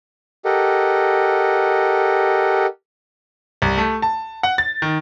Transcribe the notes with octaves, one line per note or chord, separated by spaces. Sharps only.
G4 A4 A#4 D#5 F#5
C2
A3
A5
F#5
A6
D#3